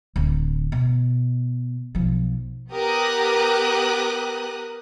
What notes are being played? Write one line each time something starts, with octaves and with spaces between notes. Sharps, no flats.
D1
B2
B1 F3
B3 G4 A#4 D#6 F#6